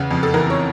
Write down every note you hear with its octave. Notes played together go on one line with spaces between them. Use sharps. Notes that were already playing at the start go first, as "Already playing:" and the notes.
Already playing: E2 C#3
F2
A4
E3 A#4
C#5